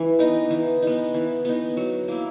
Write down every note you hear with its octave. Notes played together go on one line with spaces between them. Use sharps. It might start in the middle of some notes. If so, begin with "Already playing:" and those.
Already playing: E3
B3 D#4
E3
B3 D#4
E3
B3 D#4
F#3
A#3 E4